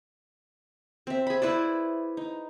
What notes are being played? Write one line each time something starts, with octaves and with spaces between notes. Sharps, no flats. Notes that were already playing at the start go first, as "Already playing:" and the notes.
C4 E5
G#4 B5
E4 B4 C5 D5
D#4